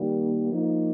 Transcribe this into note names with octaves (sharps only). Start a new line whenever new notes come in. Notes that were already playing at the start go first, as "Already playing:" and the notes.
Already playing: D#3 G3 A#3
F3 A#3 D#4